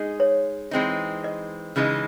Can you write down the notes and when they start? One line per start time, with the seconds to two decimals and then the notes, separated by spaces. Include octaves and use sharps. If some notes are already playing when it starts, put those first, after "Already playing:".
Already playing: G#3 D#4 G#4
0.20 C#5
0.71 E3 G#3 C4 D#4
1.24 D#5
1.76 C#3 E3 G#3 D#4